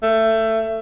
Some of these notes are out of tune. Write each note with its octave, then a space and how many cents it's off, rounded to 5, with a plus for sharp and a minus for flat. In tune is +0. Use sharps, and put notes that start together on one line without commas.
A3 +20